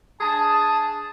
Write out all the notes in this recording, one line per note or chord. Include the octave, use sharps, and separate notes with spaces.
D4 G#4 A5